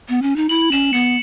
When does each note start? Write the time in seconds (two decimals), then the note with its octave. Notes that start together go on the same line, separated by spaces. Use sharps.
0.09 B3
0.22 C#4
0.36 D#4
0.49 E4 F#7
0.72 C#4 E7
0.93 B3 C#7